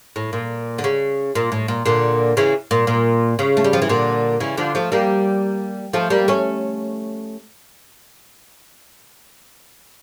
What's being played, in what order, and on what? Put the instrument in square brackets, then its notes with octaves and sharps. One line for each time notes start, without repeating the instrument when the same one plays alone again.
[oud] A2
A#2
D3
C#3
A#2
A2
A#2
A#2 D3
C#3 E3
A#2
A#2
C#3
A3
G3
F3
E3
A#2 D3
C#3 E3
D3 F3
F3 A3
G3 A#3
F3 A3
G3 A#3
A3 C#4